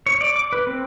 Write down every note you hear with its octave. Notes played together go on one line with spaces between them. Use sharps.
C#5
D5
D6
B4
C4